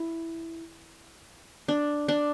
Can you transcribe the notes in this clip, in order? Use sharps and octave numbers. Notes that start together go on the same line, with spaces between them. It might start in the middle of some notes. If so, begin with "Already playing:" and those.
Already playing: E4
D4
D4